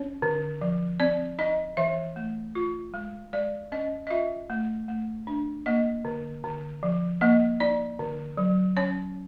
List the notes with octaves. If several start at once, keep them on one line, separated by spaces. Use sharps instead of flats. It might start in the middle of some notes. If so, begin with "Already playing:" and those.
Already playing: C#4 C#5
D3
F3
C4 D5
D#4 D#5
E3 E5
A3
F4
G#3
G#3 D5
C#4 D#5
D#5
F4 E5
A3
A3
D4
A#3 D#5
D3
D3
F3
A#3 D#5
D#4 D5
D3
F#3
C#4 C#5